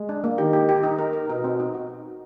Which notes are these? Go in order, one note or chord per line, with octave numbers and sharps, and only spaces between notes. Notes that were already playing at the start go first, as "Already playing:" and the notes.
Already playing: G#3
D4
A#3
D#3 G4
G4
G4
D#4
A#4
A#4
B2 D#4
C4
D#4
F#4